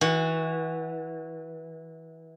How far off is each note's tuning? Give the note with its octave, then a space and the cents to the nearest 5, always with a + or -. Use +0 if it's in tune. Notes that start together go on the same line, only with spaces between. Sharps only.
E3 -25 F#4 +0